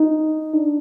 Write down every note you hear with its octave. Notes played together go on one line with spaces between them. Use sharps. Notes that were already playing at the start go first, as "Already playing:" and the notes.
Already playing: D#4
D4